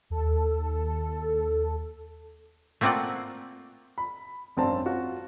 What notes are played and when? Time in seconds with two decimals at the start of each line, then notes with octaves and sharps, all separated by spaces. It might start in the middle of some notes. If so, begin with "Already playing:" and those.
0.10 D#2 A4
2.81 A3 A#3 C4 F4 D5 F#5
3.98 B5
4.57 G#1 F#2 C4 D4 A5
4.86 F4 F#4